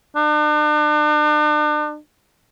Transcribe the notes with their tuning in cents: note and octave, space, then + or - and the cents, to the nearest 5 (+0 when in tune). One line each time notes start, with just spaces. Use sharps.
D4 +40